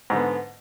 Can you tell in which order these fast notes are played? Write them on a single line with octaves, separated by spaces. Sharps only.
G#2 D3 B3